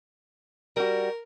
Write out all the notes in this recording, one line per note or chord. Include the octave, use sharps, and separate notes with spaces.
G3 F#4 A#4